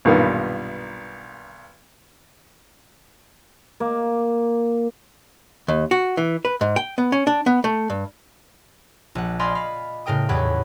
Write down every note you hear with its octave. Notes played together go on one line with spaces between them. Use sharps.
B1 G2 A#2 D#3 G3 B3
A#3
D#2
F#4
E3
B4
G#2
G5
B3
C#4
D4
B3
A3
G2
A#1 F#5
D5 D#5 F5 G#5 B5 C6
F5 B5
A2 C#3 A#4 G5 D#6
D#1 E2 G4 C#5 F#5 B5